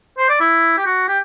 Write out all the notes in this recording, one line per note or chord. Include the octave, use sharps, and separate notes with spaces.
C5
D5
E4
G4
F#4
G4